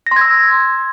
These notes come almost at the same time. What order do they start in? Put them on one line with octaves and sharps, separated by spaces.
A#6 C6 G#6 E6